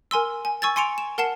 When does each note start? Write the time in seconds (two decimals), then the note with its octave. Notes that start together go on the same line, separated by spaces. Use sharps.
0.11 A#4 G#5 C6 E6
0.45 G#5
0.62 G#5 C#6 E6 G#6 A6
0.76 G#5 C6 C#7 D7 F7
0.98 E7
1.18 A#4 F#5 A5 C7 E7